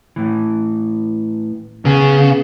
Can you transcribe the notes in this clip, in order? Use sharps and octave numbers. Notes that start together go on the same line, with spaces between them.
A2 E3
C#3 B3 G#4